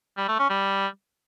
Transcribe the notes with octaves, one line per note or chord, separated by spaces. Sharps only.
G3
A3
C#4
G3